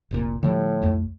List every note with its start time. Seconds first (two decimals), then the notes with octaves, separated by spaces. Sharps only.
0.11 F1 C2 A#2
0.43 A2 D3 F3 G3
0.82 B1 F2 A3